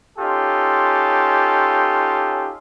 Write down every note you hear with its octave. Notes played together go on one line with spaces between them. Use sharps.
C#4 D#4 F4 G4 A4